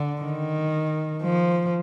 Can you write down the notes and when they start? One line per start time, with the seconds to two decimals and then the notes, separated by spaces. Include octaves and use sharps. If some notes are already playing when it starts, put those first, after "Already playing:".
Already playing: D3
0.21 D#3
1.22 F3